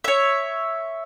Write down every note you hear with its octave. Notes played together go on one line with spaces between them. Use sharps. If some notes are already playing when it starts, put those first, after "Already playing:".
C#5 E5